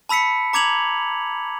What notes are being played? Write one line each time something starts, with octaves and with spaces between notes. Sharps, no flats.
A5 B5 E6 B6 C#7
A#5 D6 G#6 F7 F#7